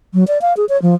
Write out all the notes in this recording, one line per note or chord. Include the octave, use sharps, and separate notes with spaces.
F#3
D5
F5
G#4
C#5
F3